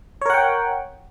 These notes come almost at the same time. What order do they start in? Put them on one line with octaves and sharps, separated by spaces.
C#5 A#4 F#5 G5